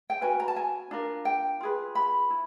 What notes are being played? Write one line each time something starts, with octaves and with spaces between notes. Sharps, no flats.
G5
C#4 F#4 B4 G#5
A#5
A5
G#5
D4 F4 A#4
G5
F4 G#4 B4
B5
E4